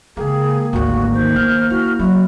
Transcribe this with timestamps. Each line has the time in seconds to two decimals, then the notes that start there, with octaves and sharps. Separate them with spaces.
0.17 C#3 G#3 A#3 G4 G#4
0.73 G#1 D2 A#2 A#3 F#4
1.14 D#3 C5
1.36 B3 F6
1.70 E4 F#4
1.99 F#3 C4 E4 F#4